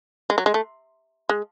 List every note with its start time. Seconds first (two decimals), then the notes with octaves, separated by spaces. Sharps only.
0.30 G#3
0.38 F#3
0.46 G#3
0.54 A3
1.29 G#3